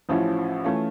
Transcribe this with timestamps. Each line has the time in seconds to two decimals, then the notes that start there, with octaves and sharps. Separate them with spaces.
0.09 A1 A2 F3 C#4 E4
0.64 E3 A3 C#4 F4